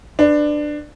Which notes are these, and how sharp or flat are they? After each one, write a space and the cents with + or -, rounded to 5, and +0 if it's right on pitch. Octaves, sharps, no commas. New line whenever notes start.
D4 +15 B4 +25